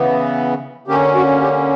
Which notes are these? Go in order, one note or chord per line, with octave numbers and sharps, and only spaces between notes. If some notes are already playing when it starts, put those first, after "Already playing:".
Already playing: C#3 E3 B3
D3 A#3 C#4 G4
F#4
G4